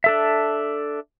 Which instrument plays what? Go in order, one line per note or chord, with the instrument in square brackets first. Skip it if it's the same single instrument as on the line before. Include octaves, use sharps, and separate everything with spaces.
[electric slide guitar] D4 A4 E5